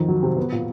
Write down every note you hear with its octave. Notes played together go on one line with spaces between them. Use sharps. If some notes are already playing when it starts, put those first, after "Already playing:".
Already playing: F2 D#3
F#3
C3
B3
A#2